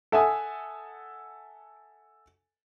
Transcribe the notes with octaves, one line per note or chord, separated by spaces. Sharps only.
A4 E5 F#5 G#5 D#6